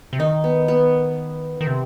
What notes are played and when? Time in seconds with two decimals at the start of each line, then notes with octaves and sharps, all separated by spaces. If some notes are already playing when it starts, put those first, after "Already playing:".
0.13 C3
0.19 D#3 D#4
0.44 B3
0.68 B3
1.61 D#3
1.67 C3